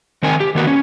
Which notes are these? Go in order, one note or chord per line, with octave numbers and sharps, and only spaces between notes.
D#3 C4 A#4 G#5
G4
D#3 A#3 B3 F#4 A#4
C#4